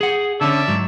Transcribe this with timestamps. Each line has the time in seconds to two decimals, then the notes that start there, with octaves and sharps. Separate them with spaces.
0.01 G#4 F#5
0.41 D3 C#4 D5 E5 A5
0.68 G#2 F#3